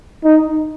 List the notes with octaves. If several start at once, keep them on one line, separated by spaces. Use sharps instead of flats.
D#4